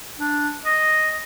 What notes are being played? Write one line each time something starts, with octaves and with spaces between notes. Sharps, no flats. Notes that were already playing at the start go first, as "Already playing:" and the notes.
D4
D#5